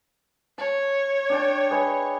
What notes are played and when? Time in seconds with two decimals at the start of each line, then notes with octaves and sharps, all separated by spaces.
0.58 C#5 A5
1.29 D4 G5 A5
1.70 G#4 B4 D#5